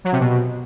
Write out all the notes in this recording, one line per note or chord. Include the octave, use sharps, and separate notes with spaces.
F#3
C3
B2